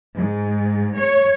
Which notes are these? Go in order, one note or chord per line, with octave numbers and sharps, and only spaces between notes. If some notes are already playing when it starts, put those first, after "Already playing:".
G#2
C#5